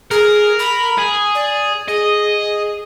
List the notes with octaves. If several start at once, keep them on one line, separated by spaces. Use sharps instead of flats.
G#4 A#4
B5
G#4
D5
G#4 D#5